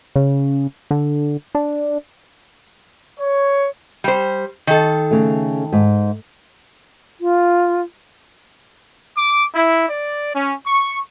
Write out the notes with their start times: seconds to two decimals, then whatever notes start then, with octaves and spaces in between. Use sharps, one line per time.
0.16 C#3
0.91 D3
1.55 D4
3.20 C#5
4.04 G3 C5
4.67 D#3 A4
5.11 C#3 A3
5.73 G#2
7.19 F4
9.18 D6
9.55 E4
9.89 D5
10.35 C#4
10.66 C#6